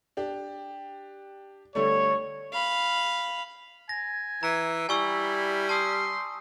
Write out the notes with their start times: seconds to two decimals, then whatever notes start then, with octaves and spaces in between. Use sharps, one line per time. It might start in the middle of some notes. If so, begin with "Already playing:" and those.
0.17 D4 G4
1.75 D3 G3 A3 C#5
2.53 F5 B5
3.89 G#5 A#6
4.43 E3 A#5
4.89 G3 E4 G#5 C#6 E6
5.69 A5 C6 D#6 E6